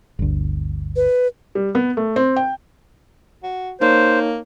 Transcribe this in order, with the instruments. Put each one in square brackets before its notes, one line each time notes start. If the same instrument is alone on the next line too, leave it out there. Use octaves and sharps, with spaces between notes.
[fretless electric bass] G1 D2
[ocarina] B4
[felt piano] G3
B3
A3
C4
G5
[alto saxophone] F#4
[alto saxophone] A#3 [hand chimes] D#4 C#5 [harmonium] C5